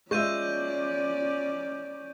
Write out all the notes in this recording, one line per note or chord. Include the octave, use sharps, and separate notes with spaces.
G#3 C#4 F4 D5 E5 C#6 G6 D#7